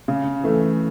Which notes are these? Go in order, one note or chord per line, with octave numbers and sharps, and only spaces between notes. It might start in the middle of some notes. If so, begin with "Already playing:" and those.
C#3
E3 A3